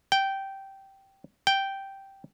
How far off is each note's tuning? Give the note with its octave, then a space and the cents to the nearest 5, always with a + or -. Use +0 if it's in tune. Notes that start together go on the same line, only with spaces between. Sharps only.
G5 -10
G5 -5